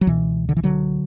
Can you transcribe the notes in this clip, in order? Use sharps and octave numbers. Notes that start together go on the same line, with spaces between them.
F#3
C#2 B2 E3
D3
E3
D3 F#3